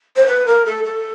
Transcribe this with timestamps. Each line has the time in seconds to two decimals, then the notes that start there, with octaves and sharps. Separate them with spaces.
0.16 C5
0.26 B4
0.46 A#4
0.65 A4
0.84 A4